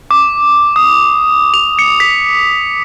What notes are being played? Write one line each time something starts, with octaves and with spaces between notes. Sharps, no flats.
D6
D#6
F7
C#7
B6